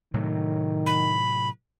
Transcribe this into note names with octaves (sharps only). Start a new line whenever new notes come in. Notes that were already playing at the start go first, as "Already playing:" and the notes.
A2 C3 D#3 F#3
B5